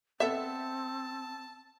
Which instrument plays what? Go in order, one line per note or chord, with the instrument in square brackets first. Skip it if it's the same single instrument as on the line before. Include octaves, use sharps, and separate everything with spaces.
[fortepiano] B3 A4 [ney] C4 [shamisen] E5 [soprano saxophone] A5